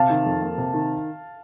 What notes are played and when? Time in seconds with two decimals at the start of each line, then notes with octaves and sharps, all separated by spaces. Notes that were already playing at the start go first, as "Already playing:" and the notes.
Already playing: C3 F5 A5
0.10 D#3
0.26 F2
0.42 A#3
0.58 C3
0.74 D#3